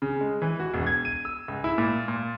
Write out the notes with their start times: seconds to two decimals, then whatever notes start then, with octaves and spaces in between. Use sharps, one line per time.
0.02 C#3
0.21 G#3
0.42 E3
0.60 F#4
0.74 E1
0.87 G#6
1.05 D#7
1.25 E6
1.48 C#2
1.64 E4
1.78 A#2
2.08 A#2